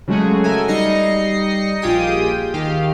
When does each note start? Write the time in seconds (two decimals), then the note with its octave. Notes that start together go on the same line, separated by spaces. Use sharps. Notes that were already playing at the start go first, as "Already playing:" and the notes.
0.08 C#3 F#3 G#3 A3 F#4 G#4
0.44 A4 A#4 E5 G#5
0.68 G3 D#4 D#5 A#6 C7 C#7
1.82 A#1 F4 G4 G#4 G5 D#6
2.54 D#2 D#3 G4 F5